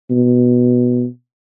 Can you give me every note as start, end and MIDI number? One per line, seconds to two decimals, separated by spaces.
0.11 1.05 47